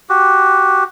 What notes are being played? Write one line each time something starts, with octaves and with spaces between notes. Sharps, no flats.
F#4 G4